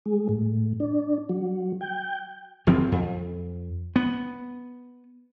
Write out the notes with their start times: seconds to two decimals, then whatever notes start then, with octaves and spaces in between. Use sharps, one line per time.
0.06 G#3
0.29 A2
0.80 D4
1.29 F#3
1.81 G5
2.67 F#1 F3 F#3 C4
2.92 F2
3.96 B3